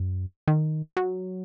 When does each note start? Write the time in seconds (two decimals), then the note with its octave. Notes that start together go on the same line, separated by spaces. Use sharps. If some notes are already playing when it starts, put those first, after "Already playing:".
Already playing: F#2
0.48 D#3
0.97 F#3